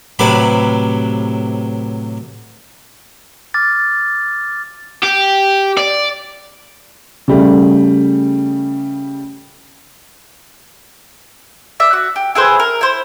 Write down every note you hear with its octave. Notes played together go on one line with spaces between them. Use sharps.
A2 C3 F#3 B4 D5 B5
D6 F6 A6
G4
D5
C#3 G3 A3
D5 E5
F#4
G4
E4 G#4 B4 C5
A#4
E4 C5